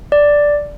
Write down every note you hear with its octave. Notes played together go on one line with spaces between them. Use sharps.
D5